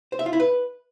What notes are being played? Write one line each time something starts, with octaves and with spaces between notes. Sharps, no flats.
C5
E5
F4
E4
B4